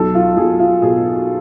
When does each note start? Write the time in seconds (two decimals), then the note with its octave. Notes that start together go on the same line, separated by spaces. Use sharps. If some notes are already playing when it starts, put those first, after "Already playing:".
Already playing: B1 A4
0.15 F4
0.37 B1 G#4
0.59 F4
0.82 B2 G#4